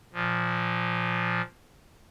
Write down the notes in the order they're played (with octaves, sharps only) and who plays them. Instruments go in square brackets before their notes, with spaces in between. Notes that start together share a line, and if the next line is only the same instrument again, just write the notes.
[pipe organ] A#2 F3